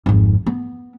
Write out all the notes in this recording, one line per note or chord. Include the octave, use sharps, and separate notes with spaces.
G#1 F2
B3